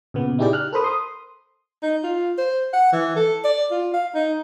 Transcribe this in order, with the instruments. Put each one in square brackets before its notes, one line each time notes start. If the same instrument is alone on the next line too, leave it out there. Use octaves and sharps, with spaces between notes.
[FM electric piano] A#2 C#3 B3
D#4 E4 G4 G#4 D5 G5
F6 F#6
A4 A#4 C5 B5 D#6
C6 D#6
[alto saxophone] D#4
F4
C5
F#5
E3
A4
D5
F4
F5
D#4